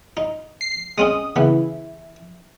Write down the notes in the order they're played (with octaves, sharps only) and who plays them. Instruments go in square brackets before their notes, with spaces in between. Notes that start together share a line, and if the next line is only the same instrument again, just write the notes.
[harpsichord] D#4
[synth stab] C7
[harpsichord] G#3 C4 C#4 [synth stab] D#6
[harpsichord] C#3 B3 [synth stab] E3 E4